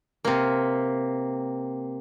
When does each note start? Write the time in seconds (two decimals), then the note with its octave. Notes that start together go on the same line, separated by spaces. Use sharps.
0.25 C3 A#3